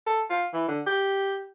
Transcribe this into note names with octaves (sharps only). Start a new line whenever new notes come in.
A4
F4
E3
D3
G4